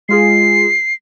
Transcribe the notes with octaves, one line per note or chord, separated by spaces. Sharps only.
G#3 F4 G#4 C7